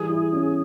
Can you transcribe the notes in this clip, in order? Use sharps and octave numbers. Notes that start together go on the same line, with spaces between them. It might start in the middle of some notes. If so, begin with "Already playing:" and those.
Already playing: E3 G3 G#4
E4
C#4